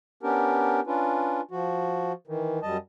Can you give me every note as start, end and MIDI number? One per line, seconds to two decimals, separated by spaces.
0.23 0.80 59
0.23 0.80 61
0.23 0.80 62
0.23 0.80 67
0.23 0.80 70
0.87 1.41 61
0.87 1.41 62
0.87 1.41 65
0.87 1.41 71
1.51 2.12 53
1.51 2.12 66
2.27 2.59 51
2.27 2.59 52
2.63 2.77 42
2.63 2.77 55
2.63 2.77 75
2.63 2.77 81